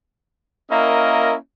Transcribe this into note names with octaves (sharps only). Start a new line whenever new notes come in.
A#3 C#4 E4 A#4 D#5